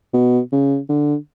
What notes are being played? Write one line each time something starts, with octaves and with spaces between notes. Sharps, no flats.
B2
C#3
D3